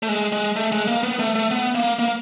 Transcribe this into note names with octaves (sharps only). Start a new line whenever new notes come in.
A3
G#3
G#3
A3
G#3
A#3
B3
A3
A3
B3
A#3
A#3